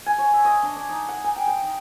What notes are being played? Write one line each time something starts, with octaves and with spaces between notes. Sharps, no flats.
G#5
C#5
E5
D#5
D4
D4
D#4
F#5
G#5
G5
G5
D#4